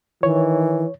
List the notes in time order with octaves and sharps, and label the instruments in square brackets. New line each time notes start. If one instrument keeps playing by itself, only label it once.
[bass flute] D#3 [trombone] E3 [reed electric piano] C#5